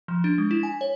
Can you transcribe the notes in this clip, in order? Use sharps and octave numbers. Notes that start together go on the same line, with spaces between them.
F3
D4
G#3
E4
G#5
C#5